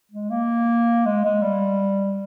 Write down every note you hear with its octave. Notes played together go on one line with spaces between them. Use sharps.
G#3
A#3
G#3
G#3
G3